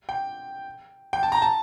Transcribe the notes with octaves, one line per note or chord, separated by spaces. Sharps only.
G5
G5
A5
A#5
A5